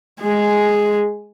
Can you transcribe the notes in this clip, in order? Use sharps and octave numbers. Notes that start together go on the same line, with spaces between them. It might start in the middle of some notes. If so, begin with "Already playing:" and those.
G#3 G#4